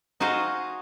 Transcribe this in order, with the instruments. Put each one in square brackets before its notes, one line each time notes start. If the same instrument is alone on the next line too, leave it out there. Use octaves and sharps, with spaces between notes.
[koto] D#4 F#4 G#4 C5 D#5 F5